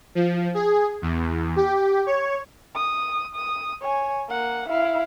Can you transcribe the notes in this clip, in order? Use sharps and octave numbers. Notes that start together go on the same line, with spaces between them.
F3
G#4
E2
G4
C#5
D#6
D#6
C#5 G#5
A#3 F#5
E4 F5